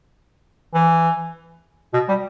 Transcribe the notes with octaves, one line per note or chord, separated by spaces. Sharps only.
E3
B2
G3